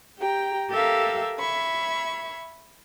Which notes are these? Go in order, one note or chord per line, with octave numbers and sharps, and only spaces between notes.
G4 G5 A#5
G4 A4 A#4 E5 F5 E6
E5 B5 C#6 G#6